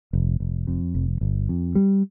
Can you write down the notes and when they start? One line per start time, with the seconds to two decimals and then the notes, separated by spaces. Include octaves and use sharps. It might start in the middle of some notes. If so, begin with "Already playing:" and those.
0.13 F1
0.40 F1
0.67 F2
0.95 F1
1.21 G1
1.49 F2
1.75 G3